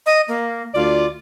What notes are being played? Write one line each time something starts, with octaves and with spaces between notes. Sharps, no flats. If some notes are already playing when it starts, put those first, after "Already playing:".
D#5
A#3
D2 F4 D5